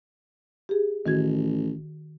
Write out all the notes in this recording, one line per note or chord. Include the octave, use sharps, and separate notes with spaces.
G4 G#4
A1 D#3 F#4 G#6